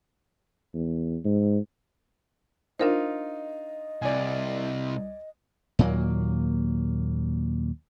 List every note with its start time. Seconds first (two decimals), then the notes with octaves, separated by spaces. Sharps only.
0.74 E2
1.24 G#2
2.79 D4 D#4 F4 A#4 C5 D#5
4.02 C2 D5 G#5
5.79 D#2 A#2 F#3 A#3